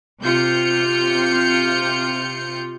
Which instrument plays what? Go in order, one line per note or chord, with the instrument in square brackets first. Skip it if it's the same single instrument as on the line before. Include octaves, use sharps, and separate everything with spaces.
[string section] C3 F4 G6 C#7